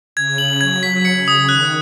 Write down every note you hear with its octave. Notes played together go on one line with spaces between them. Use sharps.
C#3 G#6
F#7
F#3 G#6
B6
C#3 C#7
D#6
D#3 F#6